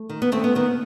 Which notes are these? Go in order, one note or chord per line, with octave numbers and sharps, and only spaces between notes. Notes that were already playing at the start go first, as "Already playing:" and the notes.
Already playing: A3
D#3
B3
D#2 A3 C4
B3
D#3 B3